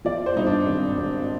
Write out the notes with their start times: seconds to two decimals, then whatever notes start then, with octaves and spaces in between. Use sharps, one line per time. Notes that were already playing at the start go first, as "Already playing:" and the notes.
0.05 F3 D5
0.26 C5
0.36 G2 D#4
0.47 D4
0.66 G#1
0.98 G#1